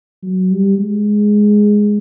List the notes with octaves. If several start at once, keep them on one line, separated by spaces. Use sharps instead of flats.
F#3
G3
G#3